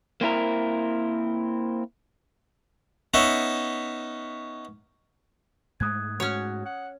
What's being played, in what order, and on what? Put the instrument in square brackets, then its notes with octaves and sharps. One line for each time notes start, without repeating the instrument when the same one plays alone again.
[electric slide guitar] A#3 C4 E4 A#4
[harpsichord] B3 C#4 D#4 C#5 E5
[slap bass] G#2 G#3 A3 [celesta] D#6 F#6 G#6
[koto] C#4 C#5 [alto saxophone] F#4
[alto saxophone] F#5